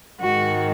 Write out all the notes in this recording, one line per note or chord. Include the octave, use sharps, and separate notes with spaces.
G#2 D#3 G#3 F#4